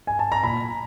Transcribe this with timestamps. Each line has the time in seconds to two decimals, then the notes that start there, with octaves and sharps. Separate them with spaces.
0.07 G#5
0.19 A5
0.32 A#5
0.43 A#2 B5